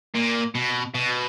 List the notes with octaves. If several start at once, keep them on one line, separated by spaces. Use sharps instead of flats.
A#2
B2
B2